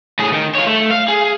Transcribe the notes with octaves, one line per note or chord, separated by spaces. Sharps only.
A2 G#4
D#3
F4 C#5
A3
F5
G#4